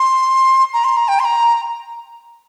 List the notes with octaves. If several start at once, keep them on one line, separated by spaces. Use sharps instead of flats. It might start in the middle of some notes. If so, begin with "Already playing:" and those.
Already playing: C6
A#5
C6
A#5
G5
C6
A#5